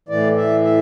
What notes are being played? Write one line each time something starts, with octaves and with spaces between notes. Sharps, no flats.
A2 E3 D5
E5
E5